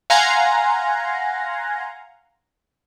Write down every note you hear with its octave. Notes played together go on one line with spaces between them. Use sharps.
F5 F#5 G#5 A#5 C6